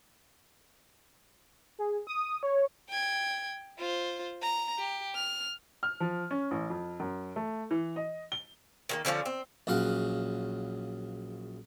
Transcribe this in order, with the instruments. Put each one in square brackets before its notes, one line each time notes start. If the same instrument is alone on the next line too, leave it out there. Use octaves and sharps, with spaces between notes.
[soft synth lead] G#4
D#6
C#5
[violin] G5 G#6
F4 C5
A#5
G4
F6
[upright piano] F6
F3
C#4
A1
F2
F#2
A3
E3
D#5
G7
[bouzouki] D#3 G3 A#3
D3 F3 C4 C#4
C4
[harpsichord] A#1 C#3 F#3 F5 F#5